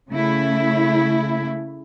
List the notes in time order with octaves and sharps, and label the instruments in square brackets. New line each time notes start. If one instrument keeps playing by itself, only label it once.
[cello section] C#3 A3 E4